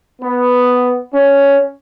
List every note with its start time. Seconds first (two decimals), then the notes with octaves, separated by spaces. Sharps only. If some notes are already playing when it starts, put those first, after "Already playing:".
0.22 B3
1.14 C#4